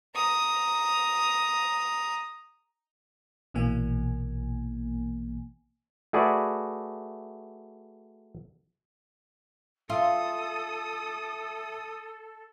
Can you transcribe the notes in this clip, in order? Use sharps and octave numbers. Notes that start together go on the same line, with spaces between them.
A#5 D#6
A#1 B2 E3 A#3 G#5
A3 F#4 G#4 B4 D5
F4 A4 E5 C6 D#6